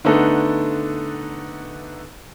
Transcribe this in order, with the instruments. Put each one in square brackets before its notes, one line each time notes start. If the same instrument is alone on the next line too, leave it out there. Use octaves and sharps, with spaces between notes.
[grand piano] D3 A3 B3 D4 D#4 A4